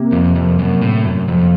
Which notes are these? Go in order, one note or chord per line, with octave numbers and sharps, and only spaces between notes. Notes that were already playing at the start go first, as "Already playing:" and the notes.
Already playing: C3 A#3
F2
F2
F#2
A2
F#2
F2